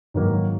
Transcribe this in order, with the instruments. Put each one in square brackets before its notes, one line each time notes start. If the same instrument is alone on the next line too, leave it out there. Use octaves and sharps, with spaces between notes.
[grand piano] G#2 D#3 F#3 A#3